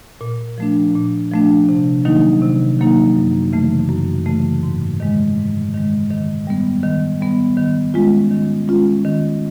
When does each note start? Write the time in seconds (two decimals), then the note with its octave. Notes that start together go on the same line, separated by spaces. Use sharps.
0.21 A#2
0.58 F3 A3 D4
0.95 A#2
1.32 F3 A3 D4
1.69 C3
2.05 D#3 F#3 A#3 D#4
2.42 C3
2.79 D#3 F#3 A#3 D#4
3.15 F#2
3.52 C#3 E3 A3
3.89 F#2
4.26 C#3 E3 A3
4.63 G#2
5.00 D#3 G#3
5.37 G#2
5.74 D#3 G#3
6.10 D#3
6.47 G3 B3
6.83 D#3
7.21 G3 B3
7.57 D#3
7.94 G#3 C#4 F4
8.31 D#3
8.68 G#3 C#4 F4
9.05 D#3